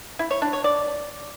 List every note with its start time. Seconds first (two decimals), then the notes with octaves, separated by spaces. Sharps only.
0.19 E4
0.31 C#5
0.42 D4
0.53 C#5
0.64 D5